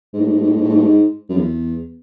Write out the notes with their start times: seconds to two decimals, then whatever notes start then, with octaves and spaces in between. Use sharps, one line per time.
0.13 G#2
0.21 A2
0.27 G#2
0.35 A2
0.41 G#2
0.48 A2
0.56 G#2
0.62 A2
0.69 G#2
0.76 A2
0.83 G#2
1.29 F#2
1.37 E2